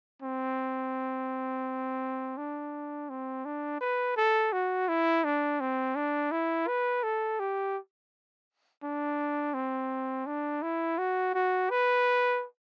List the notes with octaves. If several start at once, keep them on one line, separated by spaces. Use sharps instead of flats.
C4
D4
C4
D4
B4
A4
F#4
E4
D4
C4
D4
E4
B4
A4
G4
D4
C4
D4
E4
F#4
F#4
B4